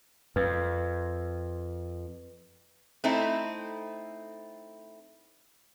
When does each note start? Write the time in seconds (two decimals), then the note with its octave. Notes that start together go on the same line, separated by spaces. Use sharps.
0.36 F2 B4
3.04 A3 C4 D#4 E4